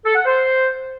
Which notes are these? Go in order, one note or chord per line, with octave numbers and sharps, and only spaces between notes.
A4
F#5
C5